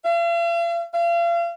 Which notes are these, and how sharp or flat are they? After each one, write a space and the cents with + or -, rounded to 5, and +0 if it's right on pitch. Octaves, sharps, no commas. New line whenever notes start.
F5 -45
F5 -35